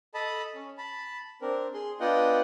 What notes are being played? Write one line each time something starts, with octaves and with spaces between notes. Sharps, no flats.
A4 D#5 A5 B5
C#4
A5 B5
C4 D4 A#4
G#4 C6
B3 D4 F4 D#5 F#5 G5